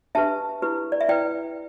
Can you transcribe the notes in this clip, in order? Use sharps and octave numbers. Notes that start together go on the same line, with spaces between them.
D4 G4 B4 E5 A5
E4 G4 B4
D5
E5
E4 B4 D5 G5